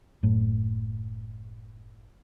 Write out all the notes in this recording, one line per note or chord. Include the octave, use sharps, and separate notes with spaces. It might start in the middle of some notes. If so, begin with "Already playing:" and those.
F#1 A2